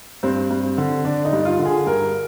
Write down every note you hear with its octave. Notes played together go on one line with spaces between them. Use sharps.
G2 C4
G2
D3
D3 D4
D#4
G2
F4
D3
G#4
G2 A#4